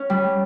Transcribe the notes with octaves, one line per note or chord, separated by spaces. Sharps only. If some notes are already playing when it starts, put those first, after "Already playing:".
Already playing: C#4
G3